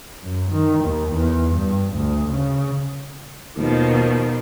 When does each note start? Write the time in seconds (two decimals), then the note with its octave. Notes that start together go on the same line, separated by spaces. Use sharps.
0.23 F#2
0.52 D#3
0.85 D#2
1.15 E2
1.55 G2
1.93 D2
2.31 C#3
3.56 D#2 B2 D#3 F3